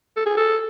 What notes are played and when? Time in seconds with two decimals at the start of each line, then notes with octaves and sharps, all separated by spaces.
0.16 A4
0.26 G#4
0.37 A4